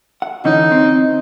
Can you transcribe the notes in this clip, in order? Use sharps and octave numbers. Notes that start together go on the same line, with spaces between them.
F#5
D3 E3 C#4 D#4
C4